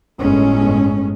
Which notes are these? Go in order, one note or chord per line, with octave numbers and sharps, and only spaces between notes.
G1 A2 G#3 C#4